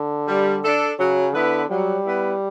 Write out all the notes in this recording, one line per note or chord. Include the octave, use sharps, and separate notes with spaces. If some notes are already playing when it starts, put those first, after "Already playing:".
Already playing: D3
G3
D4 A4
C#3 F#3
D3 B3 E4 B4
F#3 G3
B3 E4 B4